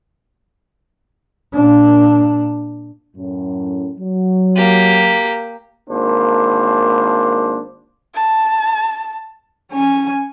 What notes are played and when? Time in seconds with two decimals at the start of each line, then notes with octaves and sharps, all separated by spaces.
1.54 A#2 D4
3.16 F#2 A2 C#4
3.99 F#3
4.56 A#3 G4
5.89 G#1 A#3 D4 C5
8.15 A5
9.72 C#4 G#5